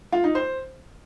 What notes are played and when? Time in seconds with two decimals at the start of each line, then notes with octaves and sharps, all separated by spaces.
0.12 F4
0.24 D#4
0.35 C5